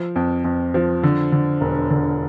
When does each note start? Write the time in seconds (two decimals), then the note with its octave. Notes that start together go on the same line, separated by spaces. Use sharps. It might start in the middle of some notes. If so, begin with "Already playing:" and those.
Already playing: F3
0.16 F2
0.44 F2
0.74 F3
1.03 D3
1.32 D3
1.61 E1
1.90 D3